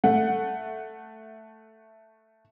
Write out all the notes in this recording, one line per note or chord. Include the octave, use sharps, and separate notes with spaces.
A3 F#5